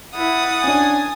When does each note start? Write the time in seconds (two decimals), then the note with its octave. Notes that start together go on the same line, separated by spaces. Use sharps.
0.15 E4 F#5 D#6 A6
0.64 C#4 D4 G#5